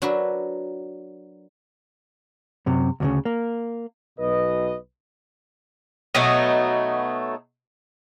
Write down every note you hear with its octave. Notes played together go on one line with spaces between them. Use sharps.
F#3 D4 F#4 A#4 B4 E5
F#2 C3
D2 A#2 C#3
A#3
B1 B2 B4 D#5
B2 F#3 A3 D#4